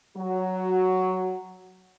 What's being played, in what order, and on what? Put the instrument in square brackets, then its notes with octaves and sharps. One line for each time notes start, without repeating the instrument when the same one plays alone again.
[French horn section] F#3 F#4